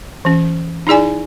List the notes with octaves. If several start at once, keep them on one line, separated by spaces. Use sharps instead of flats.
E3 C#4
D#4 E4 G#4 D5 G#5